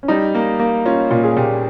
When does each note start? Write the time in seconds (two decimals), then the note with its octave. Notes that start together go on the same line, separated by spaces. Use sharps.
0.03 C#4
0.08 G3 D#4
0.35 A#3
0.59 A#3
0.86 C#4 F4
1.10 A#2 F4
1.24 G#4
1.37 A#2 G4